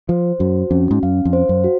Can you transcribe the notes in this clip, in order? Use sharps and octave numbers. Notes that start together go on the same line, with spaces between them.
F3 C5
F#2 F#4
F2 C#4
G#2
F#2 F5
F2
C5
F#2
F#4